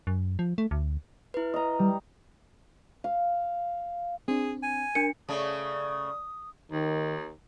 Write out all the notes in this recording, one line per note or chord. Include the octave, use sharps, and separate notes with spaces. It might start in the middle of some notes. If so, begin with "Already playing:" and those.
F#2
F3
A3
D2
E4 B4
D#5 A#5
G3
F5
C4 D4 G#4
G#5
D4 A#4 C#7
C#3 A3 D5 D#6
D#2 D#3